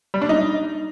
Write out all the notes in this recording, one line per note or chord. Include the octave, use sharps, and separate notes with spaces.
G3
D4
D#4